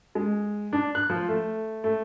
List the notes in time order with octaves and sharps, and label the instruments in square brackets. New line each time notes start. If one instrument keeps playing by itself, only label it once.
[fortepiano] G#3
D4
F#6
F3
A3
A3